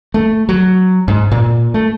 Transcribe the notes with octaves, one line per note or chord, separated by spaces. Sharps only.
A3
F#3
G#2
A#2
A3